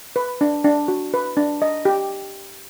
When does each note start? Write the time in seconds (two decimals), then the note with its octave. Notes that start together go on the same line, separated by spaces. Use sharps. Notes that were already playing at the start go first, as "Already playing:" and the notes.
0.16 B4
0.41 D4
0.65 D4
0.88 F#4
1.14 B4
1.37 D4
1.62 D#5
1.85 G4